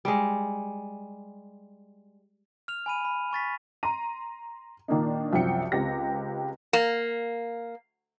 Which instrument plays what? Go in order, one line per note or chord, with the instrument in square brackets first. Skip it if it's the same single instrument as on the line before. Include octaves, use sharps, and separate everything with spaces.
[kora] G3 G#3
[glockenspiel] F6 F7
G#5 B5 D#7
B5
G#5 C#6 A6 B6
[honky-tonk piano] A#5 C6 D#7
A#2 D#3 A#3 D4 D#4
C2 F#2 F3 G5 C#7
C#2 C4 G4 A#6
[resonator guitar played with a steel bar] A#3